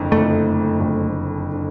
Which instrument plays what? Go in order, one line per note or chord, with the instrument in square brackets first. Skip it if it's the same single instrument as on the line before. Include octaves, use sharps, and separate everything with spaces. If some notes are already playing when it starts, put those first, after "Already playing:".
Already playing: [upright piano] F#1 F2 D3
[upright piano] F#1 F2 D3 [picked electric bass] A3
[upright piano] F#1 F2 D3
D3